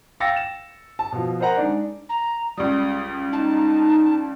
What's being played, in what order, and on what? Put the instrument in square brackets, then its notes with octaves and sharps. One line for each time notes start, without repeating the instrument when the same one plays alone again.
[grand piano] F5 G5 E6 A6 A#6 C#7
E7
A5
B2 F3
A#4 C5 D#5 F#5 A#5
G#3 D4 D#4 D5
[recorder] A#5
[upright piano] C#2 G3 [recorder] D#6
[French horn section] D#4 [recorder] A5